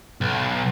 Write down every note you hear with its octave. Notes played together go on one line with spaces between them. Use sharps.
B1